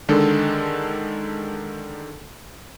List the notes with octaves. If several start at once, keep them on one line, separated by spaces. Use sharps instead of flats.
D3 D#3 G#3 D4 A4